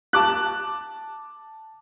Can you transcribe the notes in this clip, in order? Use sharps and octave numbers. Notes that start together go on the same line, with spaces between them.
A5 D6 F#6